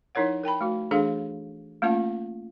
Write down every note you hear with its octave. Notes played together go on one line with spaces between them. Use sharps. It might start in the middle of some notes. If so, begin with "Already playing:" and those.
F3 D#4 E4 A#4 C#5 F#5
A#4 G5 A5 B5
A3 F#4
E3 A3 D4 G#4 A4 F5
A3 A#3 C#4 F4 A5